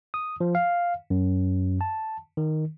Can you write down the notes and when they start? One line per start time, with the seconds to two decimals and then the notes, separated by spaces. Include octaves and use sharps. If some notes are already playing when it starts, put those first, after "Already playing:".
0.14 D#6
0.41 F3
0.55 F5
1.10 F#2
1.81 A5
2.37 D#3